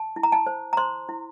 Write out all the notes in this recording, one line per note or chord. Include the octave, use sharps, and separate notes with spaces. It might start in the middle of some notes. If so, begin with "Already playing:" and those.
Already playing: A5
E4
A#5
A5
C5
A#5
C5 C6
E4